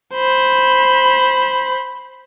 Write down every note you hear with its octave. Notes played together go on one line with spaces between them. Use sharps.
C5 B5